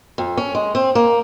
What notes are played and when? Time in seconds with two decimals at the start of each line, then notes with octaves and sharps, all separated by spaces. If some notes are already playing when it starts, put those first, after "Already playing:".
0.18 F2
0.37 C#4
0.55 G#3
0.75 C4
0.95 A#3